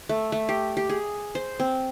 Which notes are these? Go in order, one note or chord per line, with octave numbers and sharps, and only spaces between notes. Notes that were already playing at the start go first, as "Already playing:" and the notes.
A3
A3
G4
G4
G#4
C5
C4